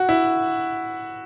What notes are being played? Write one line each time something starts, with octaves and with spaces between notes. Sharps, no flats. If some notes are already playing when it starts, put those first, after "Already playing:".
Already playing: F#4
E4